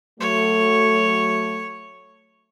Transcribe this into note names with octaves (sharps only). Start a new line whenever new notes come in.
F#3 A3 C#5